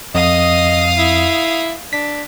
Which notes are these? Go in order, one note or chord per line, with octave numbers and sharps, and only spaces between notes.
F2 D#5 F5 D#6
E4
D4 B6